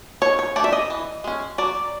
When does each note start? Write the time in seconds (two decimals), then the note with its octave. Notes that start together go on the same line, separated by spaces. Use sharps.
0.22 D#3 C#5
0.39 C#5
0.56 F#3 A3 D4 D5
0.64 E5
0.73 D#5
0.90 E3
1.24 G#3 C#4
1.58 F#3 D5